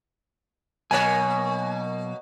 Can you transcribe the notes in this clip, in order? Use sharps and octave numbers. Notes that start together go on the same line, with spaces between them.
B1 B2 A#3 C#5 G#5